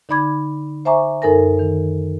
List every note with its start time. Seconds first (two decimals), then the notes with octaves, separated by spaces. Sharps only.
0.09 D3 D#4 D5 B5 D6 G#6
0.85 C5 E5 G#5 A#5 C#6 D6
1.22 F#2 D#4 A4 A#4 G#5 A#6
1.59 D#3